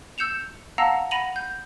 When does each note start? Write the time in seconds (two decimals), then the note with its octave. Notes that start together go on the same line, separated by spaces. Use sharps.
0.18 E6 G6 C#7 E7 F7
0.78 F5 F#5 A5 A#5 E6 A#6
1.11 F#5 B5 A#6 D#7 F7 F#7
1.36 G6